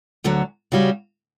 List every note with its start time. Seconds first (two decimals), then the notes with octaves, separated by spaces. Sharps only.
0.24 D2 D3 F#3
0.72 C#3 G3 C#4 F#4